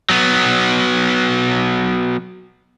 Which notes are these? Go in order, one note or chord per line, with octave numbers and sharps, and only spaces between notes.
F#3 B3